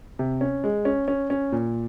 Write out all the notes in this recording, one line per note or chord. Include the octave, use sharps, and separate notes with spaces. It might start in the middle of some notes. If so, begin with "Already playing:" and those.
C3
C#4
G#3
C#4
C#4
C#4
A#2